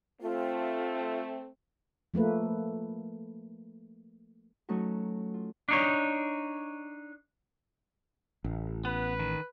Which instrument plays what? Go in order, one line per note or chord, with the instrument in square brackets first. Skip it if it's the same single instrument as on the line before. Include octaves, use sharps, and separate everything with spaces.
[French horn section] A3 C4 [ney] F4
[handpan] F3 A3 A#3 B4
[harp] F#3 A3 C#4 D#4 F#4
F4
[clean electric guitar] D4 D#4 C#5
[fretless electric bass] A1
[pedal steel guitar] B3 [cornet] B4
[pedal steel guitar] D#3